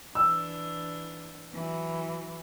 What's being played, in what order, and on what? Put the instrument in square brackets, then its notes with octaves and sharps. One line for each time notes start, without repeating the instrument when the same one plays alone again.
[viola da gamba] E3 D4 [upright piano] E6
[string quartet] E3 [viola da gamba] F#3